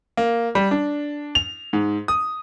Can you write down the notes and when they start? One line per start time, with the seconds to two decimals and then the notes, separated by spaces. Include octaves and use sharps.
0.17 A#3
0.55 G3
0.71 D4
1.35 F7
1.73 G#2
2.08 D#6